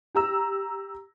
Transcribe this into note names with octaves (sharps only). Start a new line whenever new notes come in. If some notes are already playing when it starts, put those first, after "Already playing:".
G4 A#5 E6